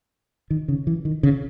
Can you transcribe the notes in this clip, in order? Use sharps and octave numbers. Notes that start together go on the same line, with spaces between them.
D#3
C#3
E3
D#3
C#3